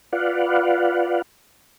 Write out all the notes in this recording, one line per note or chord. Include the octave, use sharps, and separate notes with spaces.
F4 B4 D5 F5 F#5